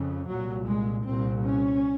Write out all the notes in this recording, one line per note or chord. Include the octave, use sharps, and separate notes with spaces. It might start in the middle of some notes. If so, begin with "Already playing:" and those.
Already playing: F2 C#3
C2 A#2 F#3
G#3
C2 A#2 C4
C#4